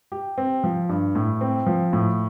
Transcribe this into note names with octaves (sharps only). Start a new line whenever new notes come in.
G4
C4
F3
G2
A2
C4
F3
A2